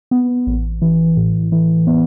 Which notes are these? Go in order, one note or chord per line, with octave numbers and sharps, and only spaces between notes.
B3
A1
E3
A2
E3
B3